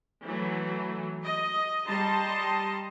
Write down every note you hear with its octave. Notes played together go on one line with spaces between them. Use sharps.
E3 F#3 A3
D#5
G3 D#5 A5 A#5 C6